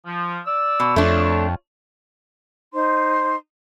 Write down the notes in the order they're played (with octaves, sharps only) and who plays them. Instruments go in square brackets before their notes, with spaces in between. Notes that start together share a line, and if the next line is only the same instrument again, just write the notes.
[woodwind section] F3
D5 E6
[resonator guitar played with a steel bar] B2
[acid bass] F2 [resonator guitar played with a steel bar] A3 D4 [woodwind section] F4 C#5
[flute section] D#4 C5 C6